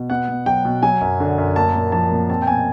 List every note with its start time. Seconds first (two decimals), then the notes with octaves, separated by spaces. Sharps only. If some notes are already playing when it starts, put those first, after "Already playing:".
Already playing: B2
0.10 B3 F#5
0.29 B2
0.46 F#3 G5
0.65 B2
0.82 F#3 G#5
1.01 F#2
1.20 D3
1.38 F#2
1.56 A#3 A5
1.74 A#2
1.92 F3 A5
2.12 A#2
2.30 C4 A5
2.42 G5
2.47 B2 G#5